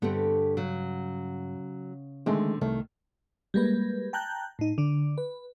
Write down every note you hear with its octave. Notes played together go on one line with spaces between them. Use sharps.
G2 D3 A3 B3 C4 G4
C#3 F#3
D3 D#3 G#3 A3 C4
C2 D#3 A3
G3 G#3 A#3 B4
G5 A5 A#5 F#6 G6
A2 D#4
D3 D4
B4